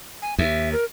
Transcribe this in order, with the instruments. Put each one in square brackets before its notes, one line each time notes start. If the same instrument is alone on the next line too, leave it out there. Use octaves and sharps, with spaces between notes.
[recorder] G#5
[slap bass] D#2 [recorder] E5
[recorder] A#4